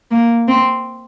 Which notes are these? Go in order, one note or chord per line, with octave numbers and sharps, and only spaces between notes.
A#3
C4